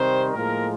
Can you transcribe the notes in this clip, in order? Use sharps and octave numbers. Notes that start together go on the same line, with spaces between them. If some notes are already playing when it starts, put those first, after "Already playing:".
Already playing: C3 D#3 G3 C4 C5
A2 F3 G#3 A#3 A#4